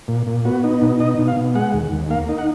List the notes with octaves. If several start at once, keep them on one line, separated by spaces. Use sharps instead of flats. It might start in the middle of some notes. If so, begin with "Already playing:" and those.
A#2
A#2
B3 F#4
D#4
B2
D#4 D#5
B2
F5
B2
G#3 F#5
D#2
D#2
A#3 F5
D#4
F#5